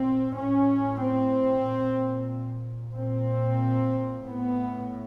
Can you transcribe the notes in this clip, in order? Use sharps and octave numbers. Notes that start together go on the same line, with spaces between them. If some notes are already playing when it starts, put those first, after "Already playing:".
Already playing: A#2 C4
A2 C#4
C4
A#2
A#2 C4
A2 B3